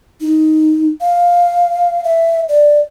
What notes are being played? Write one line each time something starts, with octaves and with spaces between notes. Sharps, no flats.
D#4
F5
E5
D5